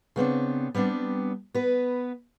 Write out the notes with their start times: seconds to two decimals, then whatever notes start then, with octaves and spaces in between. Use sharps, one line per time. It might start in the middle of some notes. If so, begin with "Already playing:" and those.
0.16 C#3 B3 C4 D4
0.75 G3 B3 C4 D4
1.54 B3 B4